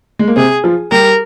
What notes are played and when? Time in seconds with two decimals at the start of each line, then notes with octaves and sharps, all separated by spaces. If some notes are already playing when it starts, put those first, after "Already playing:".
0.19 G#3
0.28 A#3
0.36 C3 C4 G#4
0.64 F3 F4
0.91 G3 G4 A#4